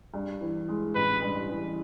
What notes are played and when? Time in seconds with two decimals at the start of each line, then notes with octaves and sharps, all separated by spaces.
0.14 G2
0.41 E3
0.68 G#3
0.95 A1 B4
1.22 G2
1.49 E3